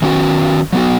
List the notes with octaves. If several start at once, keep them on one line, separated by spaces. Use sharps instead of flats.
D#3 F#3 C#4 F#4
F#3 B3 F#4